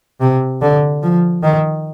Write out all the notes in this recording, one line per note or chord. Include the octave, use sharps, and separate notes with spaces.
C3
D3
F3
D#3